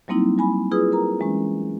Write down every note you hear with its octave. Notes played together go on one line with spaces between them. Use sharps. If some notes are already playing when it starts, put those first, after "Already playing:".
F#3 G3 A#3 C4 D#4 E4
G3 G#5 B5
E4 F4 G#4 B4 D#6
A#4 A#5
E3 G#3 C#4